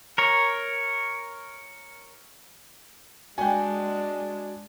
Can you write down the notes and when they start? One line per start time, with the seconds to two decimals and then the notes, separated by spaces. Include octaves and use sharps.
0.18 A#4 C#5
3.38 G#3 D4 F#4 G5 G#5